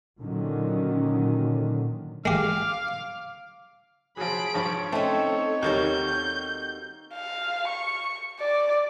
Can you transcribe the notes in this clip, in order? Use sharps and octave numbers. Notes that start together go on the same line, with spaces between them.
A#2 D3 D#3 F#3 C#4
G#3 G4 F5 D6
F3 F#3 G#4 B5 D7
G2 F3 C#5
A3 C4 C#4 D#4 A4
D#2 D#3 G3 F#4 A4 F5 G6
F5
C#6
D5